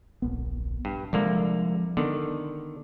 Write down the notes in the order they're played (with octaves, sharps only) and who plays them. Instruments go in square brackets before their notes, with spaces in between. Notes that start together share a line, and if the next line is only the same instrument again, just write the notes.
[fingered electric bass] D1 A#1 B3
[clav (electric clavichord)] G2
[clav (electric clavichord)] C2 D3 A#3 [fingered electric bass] F3 G#3
[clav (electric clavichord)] D3 D#3 [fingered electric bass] B3